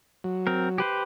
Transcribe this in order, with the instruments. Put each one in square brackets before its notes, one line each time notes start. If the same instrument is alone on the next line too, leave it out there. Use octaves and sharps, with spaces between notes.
[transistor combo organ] F#3
[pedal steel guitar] C4 A#4
G4 B4 C5